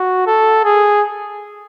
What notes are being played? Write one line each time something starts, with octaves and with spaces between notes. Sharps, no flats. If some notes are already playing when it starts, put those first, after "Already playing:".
Already playing: F#4
A4
G#4